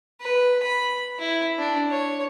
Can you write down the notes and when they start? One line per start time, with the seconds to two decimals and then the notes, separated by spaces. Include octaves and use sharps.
0.21 B4
0.63 B5
1.19 E4
1.58 D4
1.91 C#5